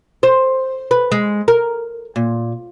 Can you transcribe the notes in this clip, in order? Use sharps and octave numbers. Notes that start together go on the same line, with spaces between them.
C5
B4
G#3
A#4
A#2